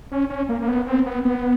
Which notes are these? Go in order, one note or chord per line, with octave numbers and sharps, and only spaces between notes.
C#4
C#4
A#3
A#3
B3
C4
B3
B3